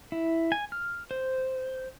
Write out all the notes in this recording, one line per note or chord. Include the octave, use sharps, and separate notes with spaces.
E4
G#5
F6
C5